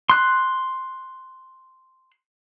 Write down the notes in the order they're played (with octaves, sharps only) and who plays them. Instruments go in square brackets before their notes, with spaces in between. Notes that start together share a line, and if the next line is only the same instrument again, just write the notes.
[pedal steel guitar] C6 F#6